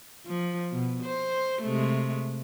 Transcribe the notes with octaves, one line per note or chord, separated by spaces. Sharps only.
F3
B2
C5
C3 G#3 A3